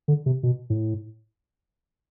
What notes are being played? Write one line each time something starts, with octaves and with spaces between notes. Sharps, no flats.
D3
C3
B2
A2